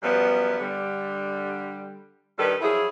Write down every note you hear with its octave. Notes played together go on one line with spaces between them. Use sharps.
F#2 F3 G3 B3
D3 G3
G2 D#3 G3 A4 B4
F3 F#3 E4 G#4